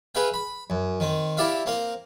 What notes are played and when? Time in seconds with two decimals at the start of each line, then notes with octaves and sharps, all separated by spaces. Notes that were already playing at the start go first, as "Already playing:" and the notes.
0.15 G#4 B4 E5 F5 G5
0.34 B5
0.70 F#2
1.00 D#3 C4
1.37 E4 G4 D5 E5 F5
1.66 A#3 C4 F5